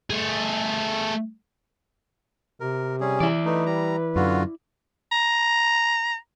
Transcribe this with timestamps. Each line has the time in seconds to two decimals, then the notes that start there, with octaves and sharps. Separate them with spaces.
0.10 A3 G#4
2.60 C3 A#4
3.00 G3 C#4 G#4
3.20 E3 E4 D5
3.45 A3 D#4 B4
3.66 G3 A#5
4.16 F#2 D3 F4 F#4
5.12 A#5